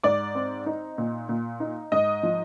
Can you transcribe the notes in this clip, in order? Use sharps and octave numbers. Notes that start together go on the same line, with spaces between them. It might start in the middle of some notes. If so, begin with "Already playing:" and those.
G#2 D5 D6
C4
D#4
A#2
A#2
D#4
G#2 D#5 D#6
F3